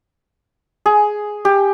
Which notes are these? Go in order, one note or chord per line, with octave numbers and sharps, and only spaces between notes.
G#4
G4